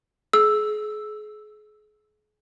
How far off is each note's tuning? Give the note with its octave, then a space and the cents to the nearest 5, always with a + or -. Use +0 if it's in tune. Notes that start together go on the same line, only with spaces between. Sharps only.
G#4 +35 E6 +0